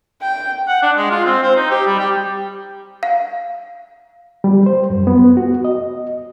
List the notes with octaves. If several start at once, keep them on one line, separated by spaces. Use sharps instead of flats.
G5
F#5
D4
G#3
F4
C4
C5
D#4
G4
G3
G4
F5
G3
C5
F#2
B3
F#4
D#5